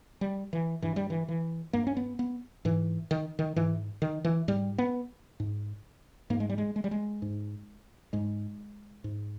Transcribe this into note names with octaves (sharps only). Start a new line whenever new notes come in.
G3
E3
G2 E3
G3
E3
E3
G2 A#3
C#4
B3
B3
G#2 E3
D#3
D#3
G#2 E3
D#3
E3
G#2 G3
B3
G#2
G#2 A#3
G#3
G3
G#3
G#3
G3
G#3
G#2
G#2 G#3
G#2